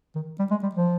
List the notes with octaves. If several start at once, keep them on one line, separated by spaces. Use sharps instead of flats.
D#3
G3
G#3
G3
F3